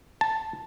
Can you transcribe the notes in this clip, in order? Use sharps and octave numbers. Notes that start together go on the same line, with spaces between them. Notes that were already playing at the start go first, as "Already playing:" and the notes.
A5